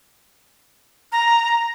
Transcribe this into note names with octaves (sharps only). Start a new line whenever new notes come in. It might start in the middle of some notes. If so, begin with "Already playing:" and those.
A#5